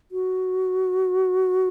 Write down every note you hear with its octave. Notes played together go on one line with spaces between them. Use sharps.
F#4